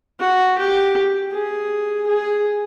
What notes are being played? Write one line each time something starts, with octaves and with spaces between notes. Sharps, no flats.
F#4
G4
G#4
G#4